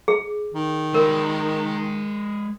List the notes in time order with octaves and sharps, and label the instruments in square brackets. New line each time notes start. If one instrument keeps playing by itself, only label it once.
[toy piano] G#4
[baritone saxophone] D#3
[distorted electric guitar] G#3 D5 [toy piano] A#4